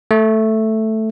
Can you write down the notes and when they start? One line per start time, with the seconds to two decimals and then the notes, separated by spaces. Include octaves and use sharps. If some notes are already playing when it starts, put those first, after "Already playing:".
0.11 A3